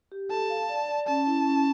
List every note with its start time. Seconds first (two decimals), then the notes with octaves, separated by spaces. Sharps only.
0.12 G4
0.30 A4 A5
0.50 F5
0.69 D5
0.89 D5
1.07 C#4 A5
1.27 E4
1.46 C#4